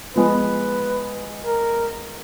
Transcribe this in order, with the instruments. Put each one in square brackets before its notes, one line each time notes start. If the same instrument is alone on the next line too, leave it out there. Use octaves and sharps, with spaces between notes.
[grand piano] F3 G#3 B3 [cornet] B4
[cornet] A#4